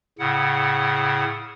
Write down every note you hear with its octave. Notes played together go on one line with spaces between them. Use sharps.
A2 C#3 F#5